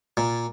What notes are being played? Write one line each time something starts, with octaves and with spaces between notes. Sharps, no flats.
A#2